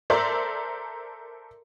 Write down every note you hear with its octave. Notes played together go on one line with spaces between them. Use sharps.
A4 A#4 C5 D5 E5 A#5